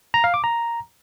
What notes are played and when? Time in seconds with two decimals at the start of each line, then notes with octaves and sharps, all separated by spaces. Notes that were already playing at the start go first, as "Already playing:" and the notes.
0.14 A#5
0.24 F5
0.34 D6
0.44 A#5